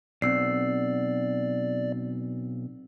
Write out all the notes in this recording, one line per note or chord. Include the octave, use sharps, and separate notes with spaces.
B1 C4 D5 E6 C7